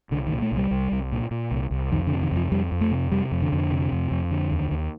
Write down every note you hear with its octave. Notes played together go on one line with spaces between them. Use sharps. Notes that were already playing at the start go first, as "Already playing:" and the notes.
C2 D3
D#3
A#2
A3
C2
G3
C2
C2
A#2
A#2
C2
C2
F2 D#3
D3
C3
D#3
F2 F3
F2 G3
F2
A3
C3
C3 G3
F2
D3
F2
C3
F2
F2
D3
D#2
D#2